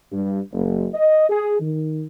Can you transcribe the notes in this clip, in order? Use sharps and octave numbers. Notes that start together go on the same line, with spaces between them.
G2
F#1
D#5
G#4
D#3